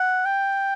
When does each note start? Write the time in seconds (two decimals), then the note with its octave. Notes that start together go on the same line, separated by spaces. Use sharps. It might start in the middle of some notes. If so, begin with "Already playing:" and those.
Already playing: F#5
0.25 G5